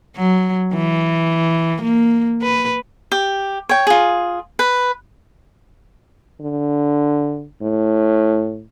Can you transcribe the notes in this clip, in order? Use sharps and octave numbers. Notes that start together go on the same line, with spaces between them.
F#3
E3
A#3
B4
G4
C#5 G5
F4 G#4
B4
D3
A2